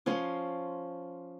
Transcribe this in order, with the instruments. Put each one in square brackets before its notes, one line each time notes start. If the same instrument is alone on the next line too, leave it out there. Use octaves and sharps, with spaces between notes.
[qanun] F3 C#4 C#5 C6